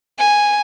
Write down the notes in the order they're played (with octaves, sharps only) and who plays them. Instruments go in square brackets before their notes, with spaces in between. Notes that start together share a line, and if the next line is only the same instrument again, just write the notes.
[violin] G#5